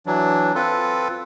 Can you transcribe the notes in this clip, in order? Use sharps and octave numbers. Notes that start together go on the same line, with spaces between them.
E3 F#3 D4
C4 F4 A4 B4